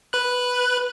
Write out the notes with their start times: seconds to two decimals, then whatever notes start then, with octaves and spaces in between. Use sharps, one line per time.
0.13 B4 F#6